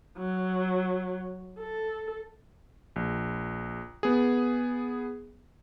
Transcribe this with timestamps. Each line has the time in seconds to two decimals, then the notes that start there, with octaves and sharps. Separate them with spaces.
0.18 F#3
1.60 A4
2.96 A#1
4.03 B3 G#4